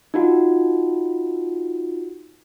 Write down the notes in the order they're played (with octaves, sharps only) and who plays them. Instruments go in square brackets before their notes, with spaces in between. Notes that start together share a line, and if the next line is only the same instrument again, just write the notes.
[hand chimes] D#4 F4 F#4